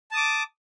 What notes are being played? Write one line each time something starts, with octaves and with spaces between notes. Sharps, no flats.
A5 D6 D#6